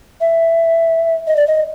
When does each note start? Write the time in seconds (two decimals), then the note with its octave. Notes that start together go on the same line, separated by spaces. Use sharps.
0.21 E5
1.27 D#5
1.37 D5
1.47 D#5